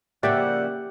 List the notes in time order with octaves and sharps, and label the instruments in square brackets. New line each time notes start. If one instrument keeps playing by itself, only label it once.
[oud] C#3 F3 A#3 [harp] G4 [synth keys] D5 E5 G5 [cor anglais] F#5